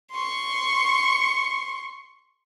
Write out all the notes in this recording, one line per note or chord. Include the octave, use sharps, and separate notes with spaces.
C6 C#6